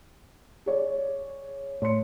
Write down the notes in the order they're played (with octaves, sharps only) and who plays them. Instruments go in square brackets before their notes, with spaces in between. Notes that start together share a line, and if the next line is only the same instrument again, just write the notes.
[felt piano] G#4 C#5 D5
[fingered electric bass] A2 [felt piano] C#5 C6 C#7